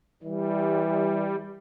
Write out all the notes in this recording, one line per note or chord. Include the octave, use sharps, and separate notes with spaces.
E3 G3